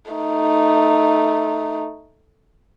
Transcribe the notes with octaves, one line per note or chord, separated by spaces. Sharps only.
A3 D#4